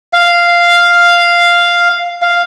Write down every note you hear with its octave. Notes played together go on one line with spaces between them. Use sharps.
F5
F5